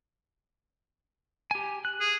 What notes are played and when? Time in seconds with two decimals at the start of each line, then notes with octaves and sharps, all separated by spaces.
1.51 G4 G#5
1.85 F#6
2.00 G#4